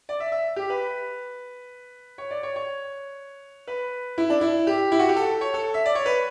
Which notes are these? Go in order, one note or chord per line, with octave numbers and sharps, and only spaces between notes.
D5
E5
E5
G4
B4
C#5
D5
C#5
C#5
B4
E4
D4
E4
G4
E4
F#4
G4
A4
C#5
A4
E5
D5
C#5
B4